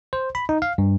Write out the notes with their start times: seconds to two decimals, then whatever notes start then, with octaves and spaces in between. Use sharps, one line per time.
0.13 C5
0.35 B5
0.49 D#4
0.62 F5
0.78 G2